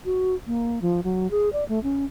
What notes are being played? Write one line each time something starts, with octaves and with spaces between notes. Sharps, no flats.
F#4
A#3
F3
F#3
G#4
D5
A3
C#4